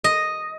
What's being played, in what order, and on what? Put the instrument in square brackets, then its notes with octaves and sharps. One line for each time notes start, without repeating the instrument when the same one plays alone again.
[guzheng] D#5